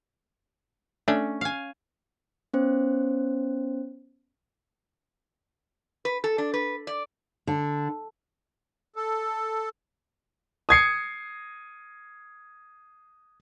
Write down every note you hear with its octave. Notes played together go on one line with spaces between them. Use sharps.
A3 C#4 D4
F5 G#5
B3 C#4 C5
B4
A4
D4
B4
D5
D3
A4
D#6 G#6 C7 C#7